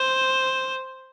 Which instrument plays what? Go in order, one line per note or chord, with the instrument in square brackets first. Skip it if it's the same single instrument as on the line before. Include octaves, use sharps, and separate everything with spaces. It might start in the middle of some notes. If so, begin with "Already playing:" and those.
Already playing: [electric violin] C5